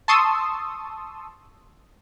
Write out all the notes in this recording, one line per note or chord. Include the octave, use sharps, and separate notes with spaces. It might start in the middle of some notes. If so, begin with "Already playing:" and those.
A5 C6 C#6 D#6 E6